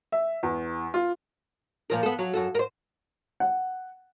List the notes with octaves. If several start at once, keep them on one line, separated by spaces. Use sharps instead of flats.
E5
E2
F4
A#2 F3 A#4
B3 A4
F#3
F#2 F#4 A4
A#4 C5
F#5